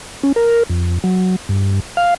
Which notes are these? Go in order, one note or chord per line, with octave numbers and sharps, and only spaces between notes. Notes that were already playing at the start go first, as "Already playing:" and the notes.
C#4
A#4
F2
F#3
G2
F5